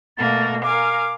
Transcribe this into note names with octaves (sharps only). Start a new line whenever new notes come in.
B2 A3 A#3 A6
A#4 F5 G#5 D6